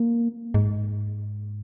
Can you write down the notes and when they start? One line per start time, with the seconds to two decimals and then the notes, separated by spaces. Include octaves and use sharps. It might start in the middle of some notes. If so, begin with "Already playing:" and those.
Already playing: A#3
0.54 G#2